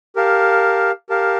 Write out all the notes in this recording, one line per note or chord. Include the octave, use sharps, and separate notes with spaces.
G4 A#4 F5 A5
G4 A#4 F5 A5